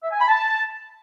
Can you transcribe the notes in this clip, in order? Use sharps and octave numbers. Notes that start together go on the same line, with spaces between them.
E5
G#5
B5
A5